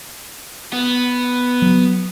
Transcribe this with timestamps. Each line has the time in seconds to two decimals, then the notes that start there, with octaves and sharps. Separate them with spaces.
0.73 B3
1.62 F#3